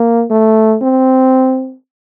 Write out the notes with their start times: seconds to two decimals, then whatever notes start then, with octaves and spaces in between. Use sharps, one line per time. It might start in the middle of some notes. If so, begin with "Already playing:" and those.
Already playing: A#3
0.31 A3
0.82 C4